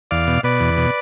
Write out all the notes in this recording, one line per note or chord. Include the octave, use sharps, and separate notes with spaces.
E2 D5 F5
B2
B2 B4 D5
E2
B2